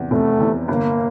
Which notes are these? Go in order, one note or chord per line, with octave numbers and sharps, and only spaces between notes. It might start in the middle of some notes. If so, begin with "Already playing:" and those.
Already playing: F1 E2 C3
F1 A3
E2 C3
G1 A#3